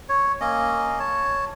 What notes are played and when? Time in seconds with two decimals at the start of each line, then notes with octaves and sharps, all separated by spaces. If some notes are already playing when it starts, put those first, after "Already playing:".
0.09 C#5
0.41 A#3 C#4 D#5
0.99 C#5 A5